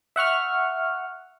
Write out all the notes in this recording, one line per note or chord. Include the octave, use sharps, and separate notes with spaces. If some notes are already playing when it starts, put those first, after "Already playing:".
E5 F#5 C#6 F6